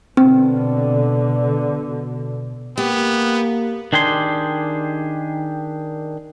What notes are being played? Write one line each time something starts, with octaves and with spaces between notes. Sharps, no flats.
B2 D3 C4
A#3 B3 G4
D#3 D4 G4 G#4 C6